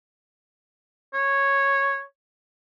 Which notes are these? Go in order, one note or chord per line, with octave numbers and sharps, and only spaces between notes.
C#5